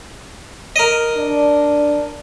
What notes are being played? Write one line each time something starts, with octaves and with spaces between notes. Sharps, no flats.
A#4 D#5
D4